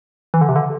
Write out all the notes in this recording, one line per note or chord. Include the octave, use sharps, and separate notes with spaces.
E3
D3
C3
D3